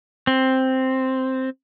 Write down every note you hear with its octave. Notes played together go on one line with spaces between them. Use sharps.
C4